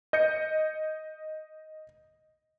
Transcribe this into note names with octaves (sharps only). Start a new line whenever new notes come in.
D#5 G6 A#6 C#7